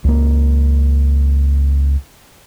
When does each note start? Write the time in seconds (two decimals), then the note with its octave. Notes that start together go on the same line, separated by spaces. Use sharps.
0.04 C#2 A#3